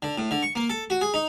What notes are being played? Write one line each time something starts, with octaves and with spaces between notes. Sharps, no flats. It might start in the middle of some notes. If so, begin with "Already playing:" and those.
D3
A2
D3
C#6
A#3
A4
F#4
G#4
D#4